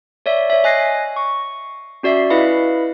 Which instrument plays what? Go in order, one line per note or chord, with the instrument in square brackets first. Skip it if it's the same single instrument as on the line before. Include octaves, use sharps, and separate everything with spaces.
[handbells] C#5 D5 E5
C#5 E5
D#5 G#5 F#6 A#6 C7
C#6
C#4 F#4 D5 E5 C7
E4 B4 D#5 F5 B5